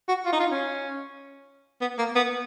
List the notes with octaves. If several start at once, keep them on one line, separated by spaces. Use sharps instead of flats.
F#4
F4
D#4
F4
C#4
B3
A#3
B3